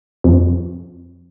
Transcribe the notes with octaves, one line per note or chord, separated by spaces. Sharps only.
F2